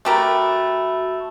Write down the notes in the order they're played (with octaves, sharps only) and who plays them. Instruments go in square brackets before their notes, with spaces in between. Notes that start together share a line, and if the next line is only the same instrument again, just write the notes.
[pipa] A3 G4 A#4 [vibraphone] F#4 E5 B5